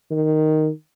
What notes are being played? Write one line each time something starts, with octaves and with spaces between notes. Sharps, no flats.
D#3